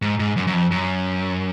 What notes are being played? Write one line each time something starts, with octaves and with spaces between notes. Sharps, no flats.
G#2
G#2
F#2
F#2
F2
F#2